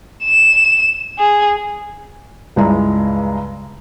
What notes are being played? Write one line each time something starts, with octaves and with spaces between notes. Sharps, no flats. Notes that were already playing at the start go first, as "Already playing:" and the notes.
E7
G#4
C#2 G2 G#3 E4 D5 A#5